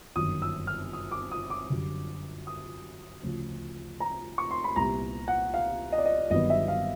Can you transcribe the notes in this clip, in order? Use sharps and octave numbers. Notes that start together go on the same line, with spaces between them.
G1 F#2 D#3 D#6
E6
F6
D#6
D6
D#6
D6
F#2 D3 G3
D#6
D2 C#3 F3
A#5
C#6
C6
B5
C2 A#2 G3 B3 A#5
F#5
F5
D#5
D5
D#5
G1 G2 D#3 F#3 B3 D#5
E5
F5